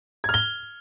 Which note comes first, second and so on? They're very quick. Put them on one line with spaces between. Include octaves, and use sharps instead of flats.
G#6 F6 G7